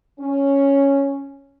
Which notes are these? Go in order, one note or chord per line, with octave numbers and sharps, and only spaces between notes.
C#4